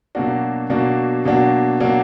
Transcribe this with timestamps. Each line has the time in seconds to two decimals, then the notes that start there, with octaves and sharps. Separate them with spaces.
0.15 B2 F#3 A#3 D4 F#4
0.70 B2 F#3 A#3 D4 F#4
1.25 B2 F#3 A#3 D4 F#4
1.80 B2 F#3 A#3 D4 F#4